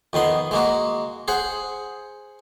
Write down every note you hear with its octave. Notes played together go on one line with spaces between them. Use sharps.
F2 D#3 B3 C6
G#3 A#3 F#4
G#4 C5 F#5